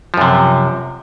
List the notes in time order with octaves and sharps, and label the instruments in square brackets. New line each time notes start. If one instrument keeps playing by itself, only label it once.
[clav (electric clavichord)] F3
F#2
C3